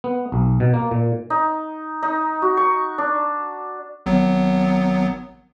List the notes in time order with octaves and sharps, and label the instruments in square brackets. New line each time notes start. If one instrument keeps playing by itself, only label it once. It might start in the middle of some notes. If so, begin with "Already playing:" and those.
[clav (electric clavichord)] B3
B1
B2
A#3
A#2
[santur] D#4
D#4
F#4
C#6
D4
[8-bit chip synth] G#1 F#3 B3